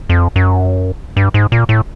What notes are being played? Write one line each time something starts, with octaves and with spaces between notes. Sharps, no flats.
F2
F#2
G2
G#2
A#2
A2